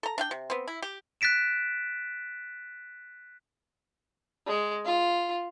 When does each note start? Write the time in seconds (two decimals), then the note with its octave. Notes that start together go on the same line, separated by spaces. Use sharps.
0.03 A4 A#5
0.18 D4 F5 G5
0.31 C3
0.50 B3 C4
0.68 E4
0.82 G4
1.21 F#6 A6 B6 D7 E7
4.47 G#3
4.85 F4